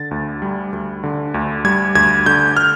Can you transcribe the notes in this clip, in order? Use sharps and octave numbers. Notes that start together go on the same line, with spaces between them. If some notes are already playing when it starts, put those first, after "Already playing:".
Already playing: D3 A6
D2
G3
D2
D3
D2
G3 G#6
D2 G#6
D3 G6
F6